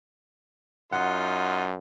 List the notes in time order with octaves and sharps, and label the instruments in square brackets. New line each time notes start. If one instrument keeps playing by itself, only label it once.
[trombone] F#2 [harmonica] D#4 F4 [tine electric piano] F#5